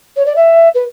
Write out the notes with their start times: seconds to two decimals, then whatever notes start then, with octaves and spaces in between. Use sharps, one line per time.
0.16 C#5
0.26 D5
0.36 E5
0.75 B4